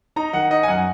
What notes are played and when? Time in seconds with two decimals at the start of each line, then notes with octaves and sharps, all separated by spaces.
0.16 D#4 A#5
0.33 D#3 F#5
0.51 D#4 D#5
0.63 G#5
0.68 F#2 F#5